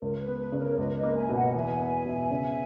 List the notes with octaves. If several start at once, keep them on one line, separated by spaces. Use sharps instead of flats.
C#2 A#4
B4
B3
B4
C#3
A#4 C#5
C#5
C#2 B4 D#5
B4 D#5
A#3
E5 G#5
B2
D#5 F#5
E2 E5 G#5
B3
B2
C#3